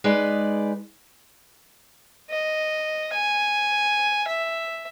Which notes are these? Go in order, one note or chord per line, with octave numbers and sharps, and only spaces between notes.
G#3 D#4 B4 D5
D#5
G#5
E5